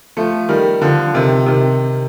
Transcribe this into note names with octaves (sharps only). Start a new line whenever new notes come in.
F3 A3
D#3 G3
D3 F3
C3 D#3
C3 D#3